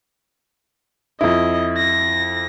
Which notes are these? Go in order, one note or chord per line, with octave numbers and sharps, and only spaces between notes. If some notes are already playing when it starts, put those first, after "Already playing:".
F2 E4 D#5
A#6